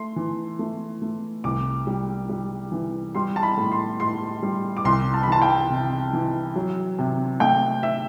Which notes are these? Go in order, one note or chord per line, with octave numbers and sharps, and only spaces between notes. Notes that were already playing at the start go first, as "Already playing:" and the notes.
Already playing: A3 C6
E3
A3
A3
C2 D6
G3
G3
E3
G3 C6
A5
B5
A2
C6
A2 C6
G3
D6
C2 C6
A5
B5
E3 A5
G5
C3
E3
F#3
C3
A3 G5
E5